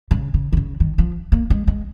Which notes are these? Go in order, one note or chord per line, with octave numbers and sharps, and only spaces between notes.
C#3
C#3
D#3
C#3
D#3
F3
A#3
G#3
G#3